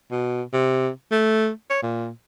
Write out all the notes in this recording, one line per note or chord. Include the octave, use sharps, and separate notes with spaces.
B2
C3
A3
C#5
A#2